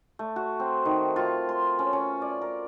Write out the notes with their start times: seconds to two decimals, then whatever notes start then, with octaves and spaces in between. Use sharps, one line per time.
0.19 A3
0.36 F#4
0.60 C4
0.85 D#3
1.16 F4
1.49 C6
1.79 C#4
1.93 C#4
2.22 D5
2.42 A#4